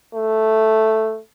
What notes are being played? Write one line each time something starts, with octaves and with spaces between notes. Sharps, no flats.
A3